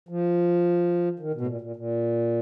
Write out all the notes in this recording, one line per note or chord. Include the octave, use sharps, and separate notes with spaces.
F3
D#3
B2
A2
A#2
A#2
A#2